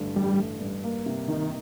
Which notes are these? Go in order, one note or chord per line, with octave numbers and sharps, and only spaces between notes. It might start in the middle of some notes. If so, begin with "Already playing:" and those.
Already playing: A1 G2 D3 A3
A1 G3
A3
G2
A#3
C3
D#3 D#4